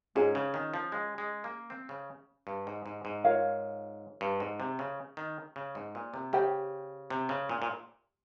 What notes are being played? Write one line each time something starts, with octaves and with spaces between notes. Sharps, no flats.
G#2 C#4 F4 G#4
C#3
D#3
F3
G#3
G#3
A#3
C4
C#3
G2
G#2
G#2
G#2
F4 A#4 C#5 F5
G2
G#2
C3
C#3
D#3
C#3
G#2
A#2
C3
C#3 G4 C5 G5
C3
C#3
A#2
A#2